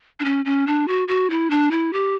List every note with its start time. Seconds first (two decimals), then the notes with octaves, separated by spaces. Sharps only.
0.20 D4
0.25 C#4
0.45 C#4
0.67 D4
0.88 F#4
1.08 F#4
1.30 E4
1.50 D4
1.71 E4
1.93 G4